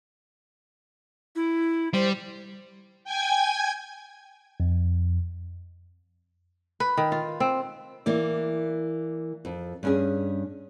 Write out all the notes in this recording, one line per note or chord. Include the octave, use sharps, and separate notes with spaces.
E4
G3 C5
G5 G#5 G#6
F2
B4
D#3
F4
C4
E3 A#3 D5
F2
G2 C#4 G#4